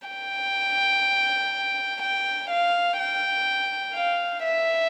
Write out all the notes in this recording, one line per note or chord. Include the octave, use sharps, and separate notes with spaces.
G5
G5
F5
G5
F5
E5